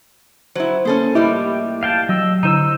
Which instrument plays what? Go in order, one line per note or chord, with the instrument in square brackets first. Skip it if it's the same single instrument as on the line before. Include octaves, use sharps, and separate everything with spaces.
[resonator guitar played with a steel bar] F#3 E4 [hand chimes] C5
[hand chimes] A#3 [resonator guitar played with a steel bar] C#4 A4 C5
[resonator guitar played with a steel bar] A2 F3 G3 [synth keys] E4 D#5 E5 [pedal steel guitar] G4
[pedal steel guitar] F5 G5 A5
[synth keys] F#3 [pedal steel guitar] D#5 G5 E6
[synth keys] D3 [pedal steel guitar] D#4 C5 E6 [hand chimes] E4 A#5